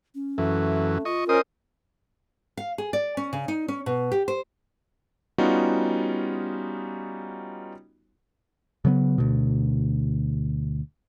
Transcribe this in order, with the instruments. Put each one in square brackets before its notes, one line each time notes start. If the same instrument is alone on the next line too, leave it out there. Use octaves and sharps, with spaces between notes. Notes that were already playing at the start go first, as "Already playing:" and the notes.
[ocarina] C#4
[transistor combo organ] F#2 E3 [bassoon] A3
[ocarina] F4 [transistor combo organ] D#5 C#6
[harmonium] C#4 A#4 [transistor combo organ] C5 D#5 D#6
[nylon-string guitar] F5
G#4
D5
C#4
C#3
D#4
C#4
B2
G4
C5
[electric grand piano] G3 B3 C#4 D#4 F4 F#4
[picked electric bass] C#3 F#3 A#3 B3
D2 B2